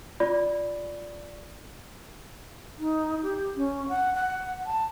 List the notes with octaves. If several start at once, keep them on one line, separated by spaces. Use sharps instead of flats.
F4 D5 B5
D#4
G4
C#4
F#5
F#5
A5